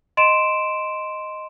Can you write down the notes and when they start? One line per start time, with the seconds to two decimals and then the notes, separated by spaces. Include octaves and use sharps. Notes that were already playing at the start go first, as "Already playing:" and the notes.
0.17 D#5 C6 D7 E7